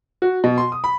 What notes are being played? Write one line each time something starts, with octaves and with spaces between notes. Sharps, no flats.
F#4
B2
C6
D#6
B5